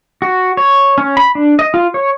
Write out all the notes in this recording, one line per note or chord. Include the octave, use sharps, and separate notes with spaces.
F#4
C#5
C#4
B5
D4
D#5
F4
C#5